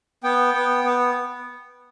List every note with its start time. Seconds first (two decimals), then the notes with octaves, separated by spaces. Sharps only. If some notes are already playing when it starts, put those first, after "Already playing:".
0.23 B3 G5
0.54 B3
0.84 B3